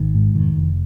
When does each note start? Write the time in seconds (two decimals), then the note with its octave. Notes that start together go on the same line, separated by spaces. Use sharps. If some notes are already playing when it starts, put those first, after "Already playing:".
Already playing: G#1 D#3
0.15 G#2
0.35 F1 D#3
0.56 F1